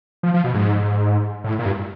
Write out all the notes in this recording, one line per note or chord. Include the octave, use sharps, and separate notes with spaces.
F3
F3
B2
G#2
A2
A#2
G2